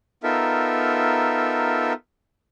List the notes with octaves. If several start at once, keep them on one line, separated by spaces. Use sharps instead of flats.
B3 D#4 F4 A4 A#4 E5